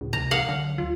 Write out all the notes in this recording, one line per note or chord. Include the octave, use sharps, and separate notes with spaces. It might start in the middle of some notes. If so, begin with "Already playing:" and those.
C#2 A2
C#2 C3 A#5
C2 F5 F#5
D3 F#3
D2 F4